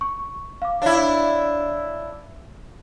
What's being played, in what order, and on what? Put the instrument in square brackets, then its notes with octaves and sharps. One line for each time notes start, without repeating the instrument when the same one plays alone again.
[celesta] C#6
F5 D6
[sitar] D4 E4 [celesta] C#5 F5